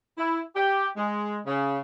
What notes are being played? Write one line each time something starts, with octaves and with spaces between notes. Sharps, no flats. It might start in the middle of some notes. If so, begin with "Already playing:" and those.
E4
G4
G#3
C#3